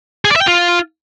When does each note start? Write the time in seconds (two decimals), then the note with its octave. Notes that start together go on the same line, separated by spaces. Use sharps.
0.25 G#4
0.30 D5
0.36 E5
0.42 G5
0.47 F4